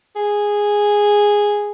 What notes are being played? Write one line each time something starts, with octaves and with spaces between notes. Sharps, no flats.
G#4